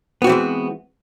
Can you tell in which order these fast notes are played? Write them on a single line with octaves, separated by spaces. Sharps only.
B3 F#4 C4 E3 G#3